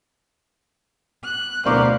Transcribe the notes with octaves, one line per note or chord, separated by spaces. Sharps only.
F#6
D1 B2 A#4 C5 D5 F5 C#6 D6